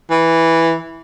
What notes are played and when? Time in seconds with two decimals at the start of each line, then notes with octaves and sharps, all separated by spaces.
0.11 E3